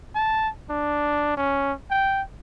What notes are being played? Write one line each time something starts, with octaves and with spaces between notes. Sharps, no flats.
A5
D4
C#4
G5